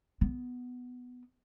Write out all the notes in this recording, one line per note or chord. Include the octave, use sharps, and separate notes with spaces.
B3